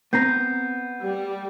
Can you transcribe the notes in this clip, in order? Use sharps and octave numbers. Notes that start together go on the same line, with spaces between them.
B3 C4 A#5 G6 C7
G3